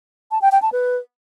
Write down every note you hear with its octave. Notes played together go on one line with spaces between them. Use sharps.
A5
G5
G5
A5
B4